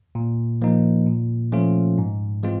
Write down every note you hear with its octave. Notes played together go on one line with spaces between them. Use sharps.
A#2
F3 A#3 D#4
A#2
F3 A3 C#4 F4
G#2
E3 G#3 C4 F4